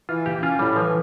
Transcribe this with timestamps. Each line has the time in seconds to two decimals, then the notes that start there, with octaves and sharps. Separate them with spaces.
0.09 E3 F4
0.25 A#3 G4
0.42 C#4 F4
0.59 A2 G3
0.76 E3 F3